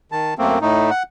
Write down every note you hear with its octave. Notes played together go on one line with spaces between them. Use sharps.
D#3 A5
F#2 A3 A#3 C4
A2 A3 D#4
F#5